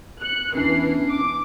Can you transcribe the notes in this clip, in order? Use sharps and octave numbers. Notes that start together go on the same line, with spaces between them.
F#6 C#7
E2 E3 C#4 D4 C7
D6